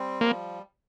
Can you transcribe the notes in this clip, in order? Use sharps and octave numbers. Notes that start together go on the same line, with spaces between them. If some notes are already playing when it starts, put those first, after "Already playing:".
Already playing: G3 C4
F3 A#3